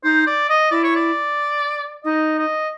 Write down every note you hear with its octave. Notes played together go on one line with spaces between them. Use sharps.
D#4 C5
D5
D#5
E4 D5
C#5
D5
D#4 D#5
D#5